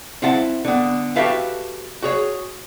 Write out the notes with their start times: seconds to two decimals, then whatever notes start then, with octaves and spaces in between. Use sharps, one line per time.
0.22 C4 E4 F#5 A5
0.65 D3 B3
1.16 F#4 G4 A4 B4 E5 F5
2.03 F#4 G#4 C#5